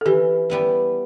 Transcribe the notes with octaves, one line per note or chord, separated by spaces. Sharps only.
A4
E3 G4
G3 B3 E4